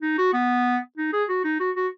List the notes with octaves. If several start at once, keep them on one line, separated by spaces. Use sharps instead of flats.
D#4
F#4
B3
D#4
G#4
F#4
D#4
F#4
F#4